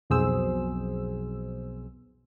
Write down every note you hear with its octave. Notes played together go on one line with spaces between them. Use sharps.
B1 F2 B2 G#4 C5 E6